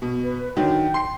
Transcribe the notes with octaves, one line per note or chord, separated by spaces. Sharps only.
B2
B4
D3 D#3 F#3 G5
C6 C7